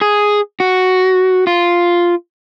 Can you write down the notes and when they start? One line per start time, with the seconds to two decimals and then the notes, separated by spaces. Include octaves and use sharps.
0.01 G#4
0.60 F#4
1.47 F4